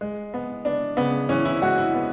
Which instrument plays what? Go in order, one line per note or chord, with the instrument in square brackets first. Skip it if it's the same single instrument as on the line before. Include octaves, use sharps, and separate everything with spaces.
[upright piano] G#3
B3
B3 D4
C#3 B3
E3 C#4
E4
G#3 F#4
E4
B3